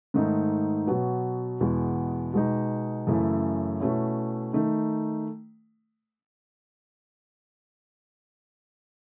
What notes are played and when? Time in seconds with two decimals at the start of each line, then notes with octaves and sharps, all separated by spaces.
0.14 G#2 D#3 A3 D#4
0.87 B2 F#3 B3
1.61 E2 B2 G#3 B3
2.34 B2 G#3 D#4
3.07 F#2 C#3 E3 A3 E4
3.80 B2 A3 C#4 E4
4.53 D#3 A3 D#4